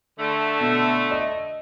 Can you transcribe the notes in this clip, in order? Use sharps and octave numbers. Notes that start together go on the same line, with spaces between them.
D3 A3
B2
D#5